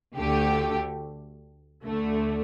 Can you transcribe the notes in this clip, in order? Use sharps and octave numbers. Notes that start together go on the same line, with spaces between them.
D2 D3 A3 G4
D2 D3 A3